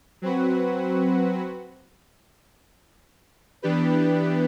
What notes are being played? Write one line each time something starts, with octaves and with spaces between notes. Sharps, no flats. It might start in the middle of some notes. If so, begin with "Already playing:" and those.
F#3 C4 F#4 B4
E3 B3 D4 G4 B4